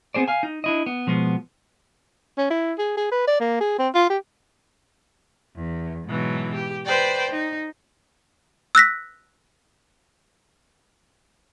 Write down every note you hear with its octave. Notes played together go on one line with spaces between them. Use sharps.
B3 C4 G#4 C5 D5
F5 G#5
D#4
D4 E4 D#5
B3
B2 F3 G#3 B3
C#4
E4
G#4
G#4
B4
D5
A#3
G#4
C4
F4
G4
E2
G#2 B2 E3 F#3
G4
B4 C5 D5 G5
D#4
E6 F#6 A#6 B6